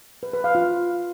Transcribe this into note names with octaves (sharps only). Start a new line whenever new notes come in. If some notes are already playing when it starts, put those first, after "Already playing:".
B4
B4
F5
F4